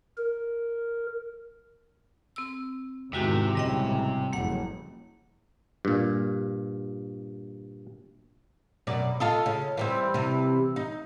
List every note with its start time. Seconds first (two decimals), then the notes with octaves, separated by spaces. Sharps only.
0.17 A#4
2.36 C4 E6
3.13 E2 G#2 C3 D#3 G#3 F#4 G4
3.55 A1 G#2 C#3 G3 D#5 G5
4.33 F#1 F2 A#3 F#5
5.85 G2 A#2
8.87 F#2 B2 D5
9.20 F4 A4 D#5
9.46 C#3
9.77 E3 G3 C4
10.14 C3 E3
10.76 D#4